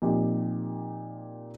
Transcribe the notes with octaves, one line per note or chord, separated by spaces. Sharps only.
A#2 F3 C4 D#4 G4